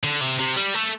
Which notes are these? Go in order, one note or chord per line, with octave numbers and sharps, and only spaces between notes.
D3
C3
C3
G3
A3